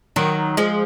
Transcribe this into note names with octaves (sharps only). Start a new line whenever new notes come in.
D#3 F#3
F3 G#3